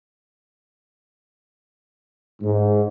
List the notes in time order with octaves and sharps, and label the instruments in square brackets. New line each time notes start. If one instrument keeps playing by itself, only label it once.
[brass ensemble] G#2